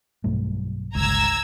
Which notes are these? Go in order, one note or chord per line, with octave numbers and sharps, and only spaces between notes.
B1 G2 A3
G1 C#2 A#5 E6 G#6